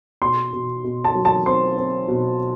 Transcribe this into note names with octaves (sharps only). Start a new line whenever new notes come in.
B2 C6
B2
B2
A5
F#3
A5
C4 C6
C4
B2